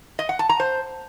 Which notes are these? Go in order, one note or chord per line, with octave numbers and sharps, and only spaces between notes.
D#5
F#5
A5
A#5
C5